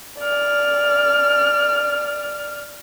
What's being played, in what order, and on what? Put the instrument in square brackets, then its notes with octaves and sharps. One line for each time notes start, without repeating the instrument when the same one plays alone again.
[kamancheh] D5 F6